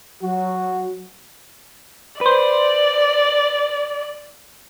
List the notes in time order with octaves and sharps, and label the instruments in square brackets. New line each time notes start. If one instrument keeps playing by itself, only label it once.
[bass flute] F#3 [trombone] F#4
[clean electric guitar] B4 C5 [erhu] D5